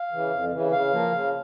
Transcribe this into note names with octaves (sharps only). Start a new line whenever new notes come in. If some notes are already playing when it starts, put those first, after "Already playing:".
Already playing: F5
C#3 E3
F2
C#3 E3
C#3 F5
F3 A#3
C#3